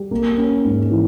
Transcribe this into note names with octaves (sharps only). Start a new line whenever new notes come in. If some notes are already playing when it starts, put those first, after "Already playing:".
Already playing: G3
A#3
C#4
G#2
E3